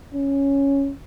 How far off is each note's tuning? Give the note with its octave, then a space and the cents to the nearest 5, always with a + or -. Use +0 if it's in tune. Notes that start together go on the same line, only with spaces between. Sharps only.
C#4 +0